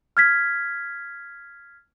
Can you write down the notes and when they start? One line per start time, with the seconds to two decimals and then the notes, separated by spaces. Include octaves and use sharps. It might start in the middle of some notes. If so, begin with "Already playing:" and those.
0.17 F6 G#6 B6